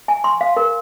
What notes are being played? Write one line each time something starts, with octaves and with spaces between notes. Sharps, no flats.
G#5
C6
F5
A#4